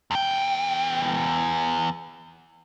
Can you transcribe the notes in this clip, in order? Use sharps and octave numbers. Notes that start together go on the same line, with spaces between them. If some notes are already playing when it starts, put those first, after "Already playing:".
E2 G5